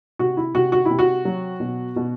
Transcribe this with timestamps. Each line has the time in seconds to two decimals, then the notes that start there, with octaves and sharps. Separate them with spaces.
0.19 C3 F#4
0.37 E4
0.55 C3 F#4
0.72 F#4
0.85 E4
0.90 C3
0.99 F#4
1.25 F#3
1.60 B2
1.96 B2